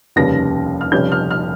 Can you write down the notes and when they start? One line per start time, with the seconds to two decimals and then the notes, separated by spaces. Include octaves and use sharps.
0.16 F1 D#2 C#3 G3 A#6
0.81 F6
0.92 F1 F2 C#3 G3 C#4 G6
1.12 F6
1.31 F6